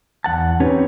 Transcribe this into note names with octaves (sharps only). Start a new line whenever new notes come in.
E2 F#5 A5
C4 C#4 D#4 G4 B4 C#5